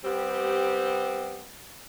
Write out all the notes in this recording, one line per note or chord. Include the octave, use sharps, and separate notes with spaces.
G3 B3 C4 G4